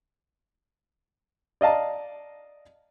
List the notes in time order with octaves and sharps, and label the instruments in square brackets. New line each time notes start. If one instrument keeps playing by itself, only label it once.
[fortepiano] D5 D#5 F5 A5 A#5